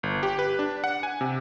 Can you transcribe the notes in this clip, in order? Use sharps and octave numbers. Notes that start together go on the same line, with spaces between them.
G1
G4
B4
D4
F#5
G#5
C3